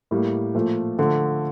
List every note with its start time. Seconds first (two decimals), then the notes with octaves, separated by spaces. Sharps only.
0.11 A2 G3 A#3
0.55 A#2 F3 A3
0.98 D3 F3 A3